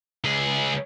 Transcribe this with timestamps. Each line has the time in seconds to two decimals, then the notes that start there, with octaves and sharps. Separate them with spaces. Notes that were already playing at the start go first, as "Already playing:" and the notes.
0.24 C#2 G#4